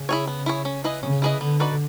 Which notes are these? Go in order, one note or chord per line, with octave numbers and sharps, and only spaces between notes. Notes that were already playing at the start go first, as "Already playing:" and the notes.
Already playing: C#3
E4 G#4 C#5
B3
E4 G#4 C#5
C#4
E4 G#4 B4 D#5
C#3 C#4
E4 G#4 B4 D#5
D3 B3
D#4 F#4 B4 D5